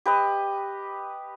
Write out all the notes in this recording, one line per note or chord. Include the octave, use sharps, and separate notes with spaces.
G4 B4 D#5